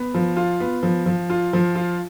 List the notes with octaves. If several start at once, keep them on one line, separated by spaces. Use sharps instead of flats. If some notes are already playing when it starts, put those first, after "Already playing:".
Already playing: B3
F3
F4
B3
F3
F3
F4
F3
F4